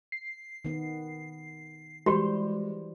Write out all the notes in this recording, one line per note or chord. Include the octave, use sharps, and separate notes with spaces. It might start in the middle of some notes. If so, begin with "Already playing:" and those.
C7
D#3 B3
E3 G3 G#3 F#4 G4 C5 B5